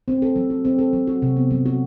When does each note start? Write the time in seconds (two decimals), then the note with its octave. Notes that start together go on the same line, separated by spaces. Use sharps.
0.08 C4
0.22 A4
0.36 F#3
0.50 F#4
0.65 C4
0.79 A4
0.93 F#3
1.07 F#4
1.22 C3
1.37 B3
1.51 F#3
1.66 F#4